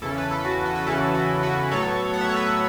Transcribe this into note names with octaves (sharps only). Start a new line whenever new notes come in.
E2 C#3 E3 C#4 E4 A4
B4
A4
F#4
F#4
B4
E2 C#3 E3 C#4 E4 A4
F#4
F#4 B4
A2 F#3 B3 A4 C#5
F#5
E5
C#5
B4 E5